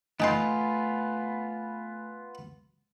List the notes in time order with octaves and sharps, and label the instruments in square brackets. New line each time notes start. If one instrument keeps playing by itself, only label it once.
[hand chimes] A3 G#5 B5 [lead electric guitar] B3 F4 [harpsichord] D#4 G5 C6